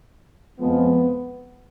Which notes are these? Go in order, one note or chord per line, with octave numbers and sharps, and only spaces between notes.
F2 F3 G#3 B3